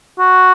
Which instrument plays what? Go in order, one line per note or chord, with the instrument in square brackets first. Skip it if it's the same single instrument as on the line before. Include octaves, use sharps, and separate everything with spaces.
[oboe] F#4